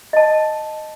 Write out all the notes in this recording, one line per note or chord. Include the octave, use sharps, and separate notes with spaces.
D#5 A5